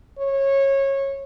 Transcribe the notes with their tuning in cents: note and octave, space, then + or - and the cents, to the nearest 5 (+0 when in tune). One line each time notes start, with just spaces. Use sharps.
C#5 -20